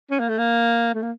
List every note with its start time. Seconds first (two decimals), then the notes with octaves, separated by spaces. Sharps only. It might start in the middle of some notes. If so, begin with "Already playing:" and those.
0.10 C#4
0.20 A#3
0.29 A3
0.38 A#3
0.94 A3
1.03 A#3